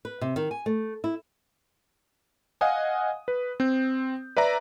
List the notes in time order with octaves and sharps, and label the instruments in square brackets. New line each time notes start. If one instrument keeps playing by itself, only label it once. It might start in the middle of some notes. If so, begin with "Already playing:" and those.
[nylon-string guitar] B4
C3
D#3
G#5
A3
E4
[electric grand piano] D#5 F5 F#5 G#5 D#6
B4
C4 G6
B4 D5 E5 A#5